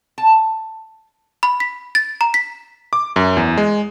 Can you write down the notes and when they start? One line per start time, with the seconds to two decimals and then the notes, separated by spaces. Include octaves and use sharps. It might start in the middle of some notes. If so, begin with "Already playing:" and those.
0.18 A5
1.43 B5
1.60 B6
1.95 A6
2.21 A#5
2.34 B6
2.93 D6
3.16 F#2
3.37 E2
3.57 G#3